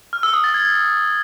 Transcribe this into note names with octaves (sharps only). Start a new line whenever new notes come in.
F6
E6
D#6
A6
G#6